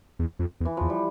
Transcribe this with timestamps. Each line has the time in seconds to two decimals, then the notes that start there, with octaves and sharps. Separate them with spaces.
0.19 E2
0.39 F2
0.60 E2
0.65 E3
0.77 E2 F3
0.90 G3